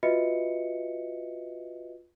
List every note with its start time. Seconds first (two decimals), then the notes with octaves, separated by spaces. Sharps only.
0.03 F4 F#4 B4 D#5 E5 C#7